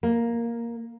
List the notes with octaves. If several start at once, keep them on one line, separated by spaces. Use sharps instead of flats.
A#3